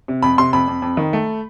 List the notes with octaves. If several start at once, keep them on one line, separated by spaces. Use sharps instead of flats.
C3
F2 B5
C3 C6
F2 B5
F2
F2
D#3
A3